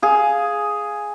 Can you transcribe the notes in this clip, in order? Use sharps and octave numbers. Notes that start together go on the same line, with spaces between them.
G#4 F5